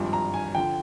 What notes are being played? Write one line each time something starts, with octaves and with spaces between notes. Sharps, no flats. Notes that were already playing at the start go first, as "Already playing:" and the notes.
Already playing: G#1 G2 F3
A#5
G#5
D3 F3 G5